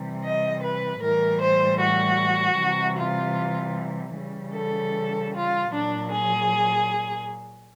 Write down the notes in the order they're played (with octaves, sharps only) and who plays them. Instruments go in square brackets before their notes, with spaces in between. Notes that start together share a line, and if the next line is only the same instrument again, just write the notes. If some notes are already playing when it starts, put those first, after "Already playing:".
Already playing: [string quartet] C3 E3 G3
D#5
B4
A2 E3 G3 A#4
C5
F#4
C3 E3 G3
F4
C#3 E3 G3
A4
F4
A#2 F#3 D4
G#4